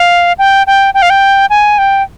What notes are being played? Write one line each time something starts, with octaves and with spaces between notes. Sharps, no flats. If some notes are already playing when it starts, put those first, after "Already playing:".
Already playing: F5
G5
G5
G5
F5
G5
G#5
G5